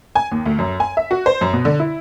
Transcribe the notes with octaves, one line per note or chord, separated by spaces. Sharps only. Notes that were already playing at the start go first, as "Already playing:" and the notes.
G#5
D#2
D2
F#2
G#5
E5
F#4
C5
F#2
B2
D3
E4